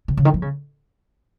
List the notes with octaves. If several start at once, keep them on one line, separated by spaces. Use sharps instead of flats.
C3
C#3
D#3
F3
C#3